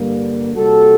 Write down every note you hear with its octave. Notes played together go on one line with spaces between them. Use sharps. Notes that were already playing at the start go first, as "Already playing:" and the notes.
Already playing: G2 D3 G3 A#3
C3 G3 A#3 F#4 A4